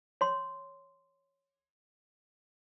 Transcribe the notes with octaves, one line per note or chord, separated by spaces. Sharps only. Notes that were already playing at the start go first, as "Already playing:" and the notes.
C#5 C6